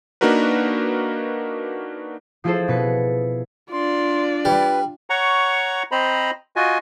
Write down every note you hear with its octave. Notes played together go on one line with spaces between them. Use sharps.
A#3 D4 D#4 F#4 A#4 B4
F3 E4 F4 G#4 A4 C5
B2 B4 C#7
D4 F4 D5 C6
G3 B4
C#5 F#5 A#5 C#6
C4 C5 D#5 A#5 B5
F4 F#4 D#5 G#5